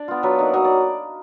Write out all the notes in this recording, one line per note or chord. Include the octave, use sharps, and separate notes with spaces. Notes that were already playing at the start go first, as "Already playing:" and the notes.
Already playing: D4 D5
B3 F4
F#3 B4
A#3 D#4 D5
F#3 D#5
D5